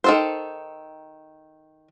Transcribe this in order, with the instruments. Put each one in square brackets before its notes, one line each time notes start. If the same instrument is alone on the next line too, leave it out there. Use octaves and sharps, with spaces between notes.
[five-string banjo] D#3 A4 C5